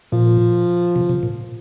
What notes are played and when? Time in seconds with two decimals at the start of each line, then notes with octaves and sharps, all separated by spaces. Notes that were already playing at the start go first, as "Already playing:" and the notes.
0.12 A#2 F3
0.96 C3
1.09 C3
1.23 A#2